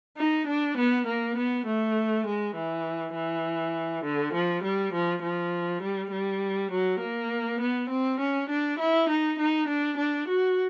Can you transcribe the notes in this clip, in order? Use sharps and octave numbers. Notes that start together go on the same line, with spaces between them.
D#4
D4
B3
A#3
B3
A3
G#3
E3
E3
D3
F3
G3
F3
F3
G3
G3
F#3
A#3
B3
C4
C#4
D4
E4
D#4
D#4
D4
D4
F#4